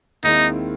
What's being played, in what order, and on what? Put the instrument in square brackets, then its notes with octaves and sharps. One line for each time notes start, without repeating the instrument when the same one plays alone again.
[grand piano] D#2 D#3 G#3 C4 E4 [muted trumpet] D#4